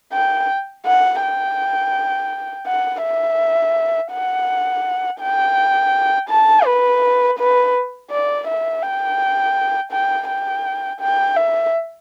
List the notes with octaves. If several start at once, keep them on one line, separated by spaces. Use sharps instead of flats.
G5
F#5
G5
F#5
E5
F#5
G5
A5
B4
B4
D5
E5
G5
G5
G5
G5
E5